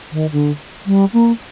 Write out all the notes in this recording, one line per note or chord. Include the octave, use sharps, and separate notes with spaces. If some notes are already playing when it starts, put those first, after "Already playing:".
D#3
D3
G3
A#3